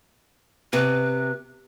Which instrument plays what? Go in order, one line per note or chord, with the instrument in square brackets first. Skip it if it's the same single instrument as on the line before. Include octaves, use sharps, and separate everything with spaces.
[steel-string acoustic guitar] C3 [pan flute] B4